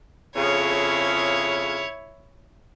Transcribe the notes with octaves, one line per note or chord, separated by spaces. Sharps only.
F2 C#3 E4 C#5